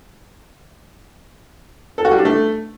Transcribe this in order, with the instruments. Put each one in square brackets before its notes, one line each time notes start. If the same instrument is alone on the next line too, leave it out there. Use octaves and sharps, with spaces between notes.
[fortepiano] A4
F#4
G3
D4
A3